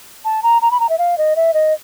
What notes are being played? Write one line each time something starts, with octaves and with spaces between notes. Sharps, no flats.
A5
A#5
A#5
B5
A#5
E5
F5
D#5
E5
D#5